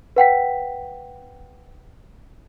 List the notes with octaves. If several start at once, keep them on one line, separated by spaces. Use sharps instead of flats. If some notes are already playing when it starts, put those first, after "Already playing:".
B4 F#5 G5 B6